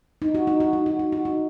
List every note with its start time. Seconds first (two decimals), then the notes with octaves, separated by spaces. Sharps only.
0.22 D#4
0.35 F#4
0.47 D#4
0.60 F#4
0.73 D#4
0.86 F#4
0.99 D#4
1.12 F#4
1.25 D#4